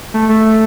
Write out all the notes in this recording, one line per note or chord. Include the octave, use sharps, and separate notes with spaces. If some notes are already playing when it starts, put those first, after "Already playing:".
A3
A3